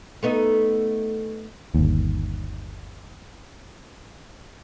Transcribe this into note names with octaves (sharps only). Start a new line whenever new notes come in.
A3 B3 D#4
G1 D#2